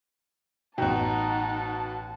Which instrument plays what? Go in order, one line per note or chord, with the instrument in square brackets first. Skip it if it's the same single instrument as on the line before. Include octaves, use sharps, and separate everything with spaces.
[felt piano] A1 G5 [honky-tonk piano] B2 F#4 [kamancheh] D#4 [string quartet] F#5 A5